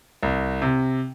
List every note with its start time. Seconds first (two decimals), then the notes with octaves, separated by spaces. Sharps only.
0.23 C2
0.62 C3